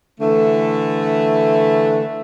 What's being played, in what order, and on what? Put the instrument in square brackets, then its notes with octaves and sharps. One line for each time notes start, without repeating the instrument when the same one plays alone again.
[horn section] D3 E3 A3